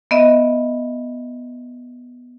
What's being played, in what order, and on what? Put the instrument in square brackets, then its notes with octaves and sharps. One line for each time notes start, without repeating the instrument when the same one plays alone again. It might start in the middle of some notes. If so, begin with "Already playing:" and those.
[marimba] B3 D#5 E5